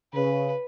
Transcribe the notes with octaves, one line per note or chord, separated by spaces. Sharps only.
C#3 B4